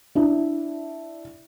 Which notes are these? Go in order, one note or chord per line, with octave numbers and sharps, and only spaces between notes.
D4 E4